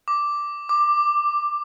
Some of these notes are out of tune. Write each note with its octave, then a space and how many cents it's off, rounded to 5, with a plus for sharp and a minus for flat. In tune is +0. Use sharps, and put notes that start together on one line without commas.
D6 -5
D6 +15